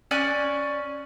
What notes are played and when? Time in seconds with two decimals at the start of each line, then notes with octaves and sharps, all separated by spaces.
0.11 C#4 D5 G#5 F#6